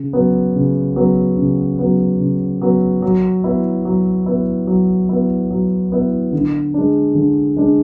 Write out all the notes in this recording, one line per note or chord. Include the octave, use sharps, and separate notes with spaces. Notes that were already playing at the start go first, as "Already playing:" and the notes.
Already playing: C#3
F#3 B3
C#3
F#3 B3
C#3
F#3 B3
C#3
F#3 B3
F#3
B3 E4
F#3
B3 E4
F#3
B3 E4
F#3
B3 E4
D3
G#3 D4
D3
G#3 D4